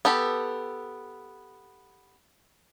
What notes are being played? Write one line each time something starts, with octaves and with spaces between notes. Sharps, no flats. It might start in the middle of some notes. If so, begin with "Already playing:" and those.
B3 G4 A4